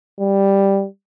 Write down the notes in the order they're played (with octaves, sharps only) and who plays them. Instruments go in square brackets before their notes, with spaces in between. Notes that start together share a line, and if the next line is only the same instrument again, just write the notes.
[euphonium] G3